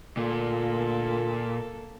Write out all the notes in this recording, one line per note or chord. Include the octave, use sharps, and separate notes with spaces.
A#2 D3 A3 A#3 F4 A4